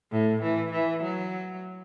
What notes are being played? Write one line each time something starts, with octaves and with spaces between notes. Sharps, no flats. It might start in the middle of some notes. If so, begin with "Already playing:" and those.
A2
E3
E3
F#3